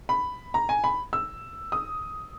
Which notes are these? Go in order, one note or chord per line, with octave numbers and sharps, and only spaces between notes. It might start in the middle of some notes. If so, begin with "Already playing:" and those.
B5
A#5
G#5
B5
E6
D#6